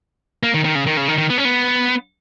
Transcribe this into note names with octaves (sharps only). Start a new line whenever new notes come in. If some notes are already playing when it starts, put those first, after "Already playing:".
A#3
D#3
D#3
C#3
D#3
C#3
D#3
D#3
B3
C#4
B3